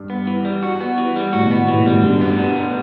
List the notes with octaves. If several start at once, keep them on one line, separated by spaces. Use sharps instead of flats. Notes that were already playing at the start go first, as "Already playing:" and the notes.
Already playing: G2
B3
E3
G3
F#4
B3
E3
G3
A2 F#4
B2
A2 B3
B2
A2 E3
B2
F#2 A2 G3
G2 B2 D3
B3
D3
G3